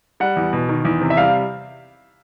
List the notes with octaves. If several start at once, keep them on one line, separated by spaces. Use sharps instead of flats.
G3 F#5
E2
B2
D#3
E2
C3
E5
G3 F5